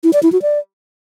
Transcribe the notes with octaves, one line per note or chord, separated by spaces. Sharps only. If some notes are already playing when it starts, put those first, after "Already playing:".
E4
D5
E4
F#4
D5